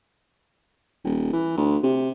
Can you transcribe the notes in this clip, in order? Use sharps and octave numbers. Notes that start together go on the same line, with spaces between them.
D#1
E3
D2
C3